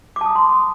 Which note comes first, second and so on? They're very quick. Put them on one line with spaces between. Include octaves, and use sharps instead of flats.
D6 A5 D#6 A#5 C6